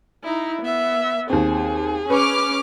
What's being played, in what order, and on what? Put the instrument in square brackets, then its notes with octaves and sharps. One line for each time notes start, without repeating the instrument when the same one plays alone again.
[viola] D#4 E4
B3 E5
[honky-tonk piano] D#2 C4 [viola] G#4
[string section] C#4 D6 F6 [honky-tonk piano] B4